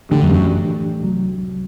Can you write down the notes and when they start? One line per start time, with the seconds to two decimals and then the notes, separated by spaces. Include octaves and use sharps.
0.11 A2 D3 E3 A3 D4 G4
0.23 F#2
0.33 F#2
1.01 C2 C3 F#3